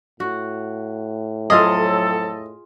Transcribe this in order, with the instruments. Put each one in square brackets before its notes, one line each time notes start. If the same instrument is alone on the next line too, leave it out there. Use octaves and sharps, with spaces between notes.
[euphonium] A2 [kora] F#4
[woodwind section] F2 F#3 A4 [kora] F4 G#4 [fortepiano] D#5